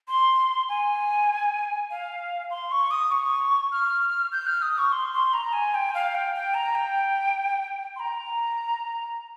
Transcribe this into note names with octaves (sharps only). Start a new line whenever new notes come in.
C6
G#5
F5
C6
C#6
D#6
C#6
F6
G6
F6
D#6
C#6
C6
C6
A#5
G#5
G5
F5
G5
G5
A#5
G5
C6
A#5